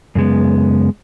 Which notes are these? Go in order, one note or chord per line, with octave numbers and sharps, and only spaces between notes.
F#2 C#3 G#3 B3